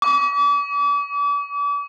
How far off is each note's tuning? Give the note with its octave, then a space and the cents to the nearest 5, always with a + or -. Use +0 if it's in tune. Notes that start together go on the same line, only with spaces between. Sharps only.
D6 -40